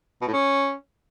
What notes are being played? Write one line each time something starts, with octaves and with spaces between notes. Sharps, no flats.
B2
A2
C#4